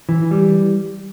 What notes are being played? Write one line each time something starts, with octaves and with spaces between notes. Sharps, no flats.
E3
G3